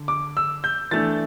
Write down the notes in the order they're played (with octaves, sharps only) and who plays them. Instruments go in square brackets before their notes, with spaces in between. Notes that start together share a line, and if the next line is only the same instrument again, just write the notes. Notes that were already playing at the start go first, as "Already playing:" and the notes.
Already playing: [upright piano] D3
D6
E6
G6
E3 A3 D4 A6